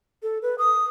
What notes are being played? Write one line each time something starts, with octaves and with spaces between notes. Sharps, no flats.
A4
B4
D#6